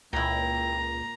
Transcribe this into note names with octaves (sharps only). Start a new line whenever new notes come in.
C#2 A#2 E4 G5 A#5